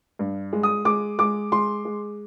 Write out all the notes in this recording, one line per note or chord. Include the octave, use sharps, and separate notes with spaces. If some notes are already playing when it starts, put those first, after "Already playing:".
G2
G#3
D#6
G#3 D6
G#3 D6
G#3 C6
G#3